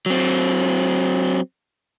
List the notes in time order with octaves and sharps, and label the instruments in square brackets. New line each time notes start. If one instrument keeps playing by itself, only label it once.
[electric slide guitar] F#3 C4